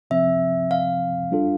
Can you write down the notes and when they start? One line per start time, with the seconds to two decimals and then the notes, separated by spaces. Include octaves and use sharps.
0.10 C3 F3 C4 E5
0.71 F5
1.31 G3 D4 F4 A4